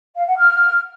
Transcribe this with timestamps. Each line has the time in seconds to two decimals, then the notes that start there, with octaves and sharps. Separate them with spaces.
0.16 F5
0.27 F#5
0.38 F6